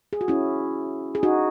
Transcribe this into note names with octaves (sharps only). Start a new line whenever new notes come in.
G#4
F#4
C#4 E4
G#4
D#4 F#4